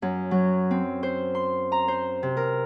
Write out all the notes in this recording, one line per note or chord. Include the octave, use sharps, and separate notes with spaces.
F#2
F#3
C4
C5
C6
A#5
C5
C3
A#4